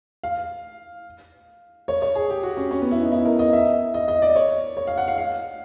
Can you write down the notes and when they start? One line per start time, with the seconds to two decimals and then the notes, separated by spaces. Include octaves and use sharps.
0.24 F5
1.88 C#5
2.02 C#5
2.15 G#4
2.30 G4
2.43 F#4
2.57 C#4
2.71 C#4
2.82 B3
2.91 E4
3.01 D#4
3.12 E4
3.25 A#4
3.39 D#5
3.53 E5
3.94 D#5
4.08 D#5
4.22 D5
4.35 C#5
4.77 C#5
4.87 F5
4.98 F#5
5.08 F5
5.18 F5